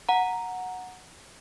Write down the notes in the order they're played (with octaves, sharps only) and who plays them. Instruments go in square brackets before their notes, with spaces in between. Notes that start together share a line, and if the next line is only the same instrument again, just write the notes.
[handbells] F#5 A#5